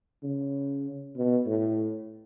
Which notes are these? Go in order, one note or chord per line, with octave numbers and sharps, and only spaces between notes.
C#3
B2
A2